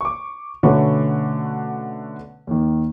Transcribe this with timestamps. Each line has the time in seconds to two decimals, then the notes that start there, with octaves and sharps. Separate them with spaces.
0.01 C#6 D6
0.63 B2 D3 A3 C#4 B4 C#6
2.47 D#2 D#3